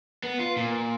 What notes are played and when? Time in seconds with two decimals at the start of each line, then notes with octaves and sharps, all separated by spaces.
0.23 B3
0.39 F4
0.56 A#2